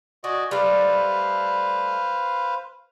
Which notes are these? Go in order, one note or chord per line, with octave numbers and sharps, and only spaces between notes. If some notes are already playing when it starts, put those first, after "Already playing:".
F#4 D5 D#5 G#5
G3 A3 B4 C5 F5